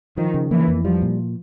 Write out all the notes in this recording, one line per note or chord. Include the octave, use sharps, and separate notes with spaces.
D#3 F3
C#3
E3 A#3
F2
F3 G3
A#2